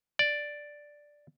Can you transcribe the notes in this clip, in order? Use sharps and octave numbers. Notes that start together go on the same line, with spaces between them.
D5